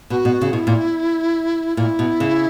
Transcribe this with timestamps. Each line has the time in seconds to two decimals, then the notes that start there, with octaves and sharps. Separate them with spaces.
0.10 B2 F#4
0.25 B2
0.41 C#3
0.53 B2 E4
0.67 A#2
1.77 A#2 E4
1.99 B2
2.20 C#3